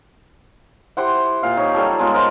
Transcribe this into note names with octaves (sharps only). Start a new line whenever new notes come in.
E4 G4 C5 F#5
A#2 F5
D#4 C#5
F#3 G3 G4 A4
G#3 B3 F4
A#4 C5 D#5